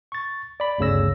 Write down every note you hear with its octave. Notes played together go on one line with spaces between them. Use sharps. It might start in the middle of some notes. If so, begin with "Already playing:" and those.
C#6 A6
D5 B5
G1 D2 C#3 C#5 E6 A#6